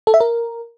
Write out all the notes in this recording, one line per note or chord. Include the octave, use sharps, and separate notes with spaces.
A4
E5
A#4